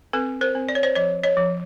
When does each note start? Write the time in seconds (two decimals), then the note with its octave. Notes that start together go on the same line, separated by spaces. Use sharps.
0.13 C4 A4 B4
0.41 A#4 C5
0.55 C4
0.69 D5
0.75 C#5
0.83 C5 D5
0.95 F3 C#5 D#5
1.23 C#5 D#5
1.37 F3